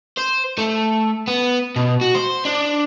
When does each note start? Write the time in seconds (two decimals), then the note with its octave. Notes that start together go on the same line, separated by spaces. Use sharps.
0.18 C5
0.58 A3
1.28 B3
1.76 B2
2.01 F#4
2.15 C5
2.45 D4